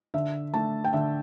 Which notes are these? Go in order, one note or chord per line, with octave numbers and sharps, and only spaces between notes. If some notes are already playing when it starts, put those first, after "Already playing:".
D3 E5
A3 D4 A5
G5
D3 E5